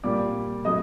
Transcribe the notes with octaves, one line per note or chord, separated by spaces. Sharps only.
A#2 G3 A#3 D5 D6
F#3 A3 D#5 D#6